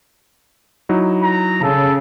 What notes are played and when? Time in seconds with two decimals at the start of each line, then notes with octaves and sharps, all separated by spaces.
0.89 F#3 D#4 E4
1.23 A#5
1.63 C#3 A4